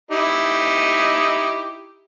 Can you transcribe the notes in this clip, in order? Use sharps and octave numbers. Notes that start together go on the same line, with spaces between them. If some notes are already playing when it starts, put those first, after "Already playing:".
D#4 E4 G4